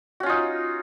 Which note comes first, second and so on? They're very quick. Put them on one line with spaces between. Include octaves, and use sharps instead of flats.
F#4 C#4 F4 D#4